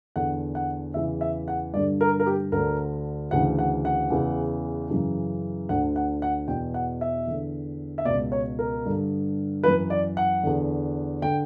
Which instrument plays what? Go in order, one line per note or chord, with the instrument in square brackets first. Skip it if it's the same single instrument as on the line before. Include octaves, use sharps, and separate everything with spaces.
[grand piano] E2 D3 F#5
F#5
E2 C#3 E3 E5
E5
F#5
G2 D3 D5
A#4
A#4
G4
D2 D3 A#4
D2 C#3 E3 F#5
F#5
F#5
E2 C#3 E3
F#2 C#3 E3
D2 D3 F#5
F#5
F#5
E2 B2 G5
F#5
E5
E2 D3
E5
C#2 B2 D5
C#5
A#4
G2 D3
F#2 E3 B4
D5
F#5
E2 D3
D3 G5